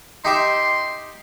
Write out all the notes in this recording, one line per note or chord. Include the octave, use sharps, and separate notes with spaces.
D#4 G4 E5 C6